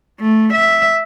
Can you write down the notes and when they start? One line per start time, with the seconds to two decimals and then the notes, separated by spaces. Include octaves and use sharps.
0.20 A3
0.53 E5